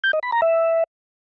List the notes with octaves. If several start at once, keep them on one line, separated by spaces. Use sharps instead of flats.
G6
D#5
B5
A#5
E5